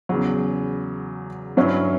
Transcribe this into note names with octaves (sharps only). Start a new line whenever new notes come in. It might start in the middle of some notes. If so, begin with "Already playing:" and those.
E2 C#3 F#3
G2 F#3 C#4 E4